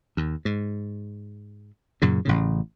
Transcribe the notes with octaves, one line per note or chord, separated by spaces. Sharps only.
D#2
G#2
F#2 A#2 C#3
A1 A2 C#3